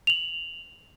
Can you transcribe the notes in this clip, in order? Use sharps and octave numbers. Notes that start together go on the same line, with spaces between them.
F7 F#7